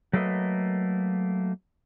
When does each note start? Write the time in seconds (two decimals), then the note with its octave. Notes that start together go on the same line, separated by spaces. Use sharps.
0.13 F#3 A3 A#3 A4 B4 D#5